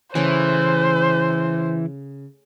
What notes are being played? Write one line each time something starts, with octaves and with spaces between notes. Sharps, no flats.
C#3 E3 A3 C#4 C5